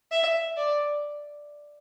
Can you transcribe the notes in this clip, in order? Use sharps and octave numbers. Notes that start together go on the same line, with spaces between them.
E5
D5